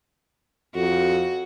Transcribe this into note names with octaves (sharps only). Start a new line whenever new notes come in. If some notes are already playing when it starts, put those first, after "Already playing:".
F2 F#4